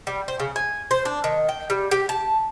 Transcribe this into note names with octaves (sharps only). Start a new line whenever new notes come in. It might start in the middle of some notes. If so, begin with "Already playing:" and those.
G3
C5
C#3
G#5
C5
D4
D#3
G5
G3
G4
A5